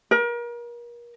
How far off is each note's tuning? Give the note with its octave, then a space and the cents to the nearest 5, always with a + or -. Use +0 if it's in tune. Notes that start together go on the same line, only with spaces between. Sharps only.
A#4 +35